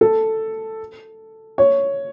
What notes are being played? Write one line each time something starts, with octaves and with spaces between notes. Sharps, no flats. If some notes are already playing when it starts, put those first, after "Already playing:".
A4
C#5